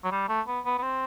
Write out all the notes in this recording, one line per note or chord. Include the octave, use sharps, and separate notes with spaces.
F#3
G3
A3
B3
B3
B3
C4